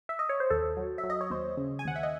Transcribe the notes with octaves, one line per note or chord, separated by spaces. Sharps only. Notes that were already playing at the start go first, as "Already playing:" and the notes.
E5
D#5
C#5
C5
D#2 A4
F#3
E5
F#3
D#5
C#5
D#2 C5
C#3
G#5
D#2 F#5
E5
D#5